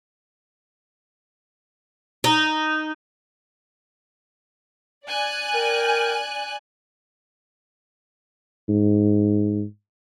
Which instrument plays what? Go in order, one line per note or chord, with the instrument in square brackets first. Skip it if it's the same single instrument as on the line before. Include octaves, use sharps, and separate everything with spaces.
[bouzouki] D#4
[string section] D5 G#5 F#6
[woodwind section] A#4 G5
[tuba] G#2